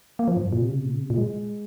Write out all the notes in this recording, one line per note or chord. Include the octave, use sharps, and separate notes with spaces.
A#3
F3
G2
A#2
C3
C#3
C3
A#2
C#3
C3
A#2
G#3